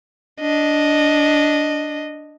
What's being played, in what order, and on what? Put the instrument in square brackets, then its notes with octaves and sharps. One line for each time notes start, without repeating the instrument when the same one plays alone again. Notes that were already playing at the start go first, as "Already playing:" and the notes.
[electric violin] D4 D#5